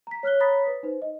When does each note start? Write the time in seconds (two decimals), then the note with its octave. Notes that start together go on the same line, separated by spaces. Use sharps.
0.07 A#5 B6
0.23 C#5 F6 F#6 G7
0.40 C#5 A#5 B5 D#6 A6 B6
0.67 B4
0.83 D#4 B4 C5
1.02 D#5